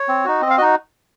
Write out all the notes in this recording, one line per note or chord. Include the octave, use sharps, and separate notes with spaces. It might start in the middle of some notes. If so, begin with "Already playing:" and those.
Already playing: C#5
C4
D#4 F#4
C4 D#5
F5
D#4 F#4 D#5